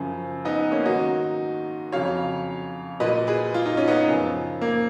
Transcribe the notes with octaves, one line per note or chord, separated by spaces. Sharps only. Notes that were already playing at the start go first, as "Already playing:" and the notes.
Already playing: F#2 C#3 F3
B3 D#4
B3
A#3 C#4
G#2 D#3 F#3 D#4 F#4
F2 C#3 F#3 C#5 F5
A#2 F#3 B4 D#5
G#4 B4
F4
D#4
C#4
B3 D#4
F#2 C#3 F3
A#3